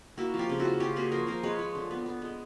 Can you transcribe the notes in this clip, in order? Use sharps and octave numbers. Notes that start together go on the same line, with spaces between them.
A#3 E4 F#4
F3
F4 G4
C#3
E4 F#4
C#4
C#4 F4 G4
A#3 F#4 G#4
F3 A#4 C5
F3 A#4 C5
G#3 B4 C#5
F3
D3
B3
B3
G#3